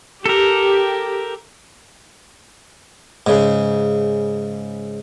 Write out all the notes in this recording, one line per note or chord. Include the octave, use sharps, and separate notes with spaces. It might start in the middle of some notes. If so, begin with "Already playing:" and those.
G4 A4 A#4
G#2 C#3